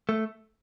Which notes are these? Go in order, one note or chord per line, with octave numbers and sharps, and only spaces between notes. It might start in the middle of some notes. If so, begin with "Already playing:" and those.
A3